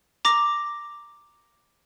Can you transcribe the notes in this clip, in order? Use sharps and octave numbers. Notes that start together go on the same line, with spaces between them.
A#5 D6 A#6